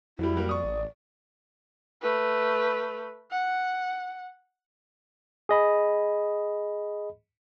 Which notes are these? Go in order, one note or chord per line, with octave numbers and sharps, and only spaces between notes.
F2 F#3 G3 E4
F#3 G3 A#3
D5 C#6 D#6
A1
A3 B4
F#5
G#4 D#5 B5